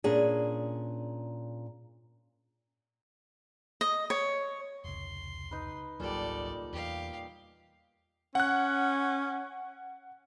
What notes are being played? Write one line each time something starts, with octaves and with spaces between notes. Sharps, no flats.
A#2 C#4 D4 G#4
D#5
C#5
F1 C#2 C6
D#4 B4
G#1 C#2 A#2 F#3 G3 A4 D5
E2 G4 F5
C#4 F#5 F#6